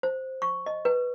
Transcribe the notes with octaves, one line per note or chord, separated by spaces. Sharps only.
C5
C#6
D#5
B4